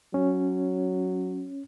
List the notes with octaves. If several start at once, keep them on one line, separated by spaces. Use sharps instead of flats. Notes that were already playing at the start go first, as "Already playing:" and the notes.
F#3 C#4